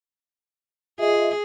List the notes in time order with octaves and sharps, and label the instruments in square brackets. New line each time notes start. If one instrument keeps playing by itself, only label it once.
[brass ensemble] F4 D#5 E5 [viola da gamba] G#4